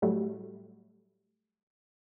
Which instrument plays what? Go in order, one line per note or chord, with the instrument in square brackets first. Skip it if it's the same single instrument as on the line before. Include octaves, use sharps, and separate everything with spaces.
[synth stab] A2 F#3 G3 A3